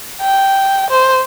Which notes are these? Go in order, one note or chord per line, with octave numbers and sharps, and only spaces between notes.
G5
C5